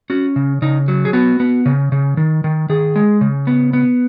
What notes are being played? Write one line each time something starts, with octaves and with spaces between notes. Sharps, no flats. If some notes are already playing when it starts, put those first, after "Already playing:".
C#4 F#4
C#3
C#3 D#4
F#3
G#4
B3 F#4
B3
C#3
C#3
D#3
D#3
D#3 G#4
G#3
C#3
B3
B3